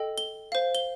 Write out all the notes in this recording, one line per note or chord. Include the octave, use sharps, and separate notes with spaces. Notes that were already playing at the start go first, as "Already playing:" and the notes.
Already playing: A4 D#5 G5
G7
C5 F5
G7